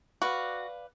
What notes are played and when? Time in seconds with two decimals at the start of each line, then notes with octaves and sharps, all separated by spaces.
0.22 F#4 B4 D5 F5